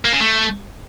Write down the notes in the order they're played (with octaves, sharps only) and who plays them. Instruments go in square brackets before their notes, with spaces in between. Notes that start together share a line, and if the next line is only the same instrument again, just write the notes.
[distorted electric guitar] A#3
C#3
A3